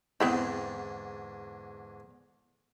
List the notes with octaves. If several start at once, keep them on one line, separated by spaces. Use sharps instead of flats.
E2 G#2 D3 B3 C4 E4